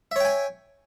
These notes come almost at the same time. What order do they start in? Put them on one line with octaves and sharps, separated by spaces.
E5 C#5 G5 G#5